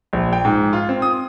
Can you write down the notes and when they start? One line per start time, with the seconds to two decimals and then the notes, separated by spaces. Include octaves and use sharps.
0.13 A#1
0.33 G5
0.45 G#2
0.73 F4
0.89 C4
1.02 D#6